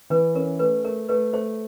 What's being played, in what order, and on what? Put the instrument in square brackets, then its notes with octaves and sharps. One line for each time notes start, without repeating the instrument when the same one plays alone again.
[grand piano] E3 [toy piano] B4
[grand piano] C#4 [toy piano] A#4
[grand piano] A3 [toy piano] B4
[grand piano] A3 [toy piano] A#4
[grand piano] A3 [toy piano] B4
[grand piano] A3 [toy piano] C5